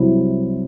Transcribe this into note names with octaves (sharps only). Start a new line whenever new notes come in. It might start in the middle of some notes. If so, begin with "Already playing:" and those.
Already playing: C2 C3 F#3 E4